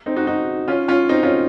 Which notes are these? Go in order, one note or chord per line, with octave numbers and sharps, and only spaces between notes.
C4 D#4
D#4 F#4
D#4 F#4
C#4 F4
C#4 F4
C4 D#4
C#4 F4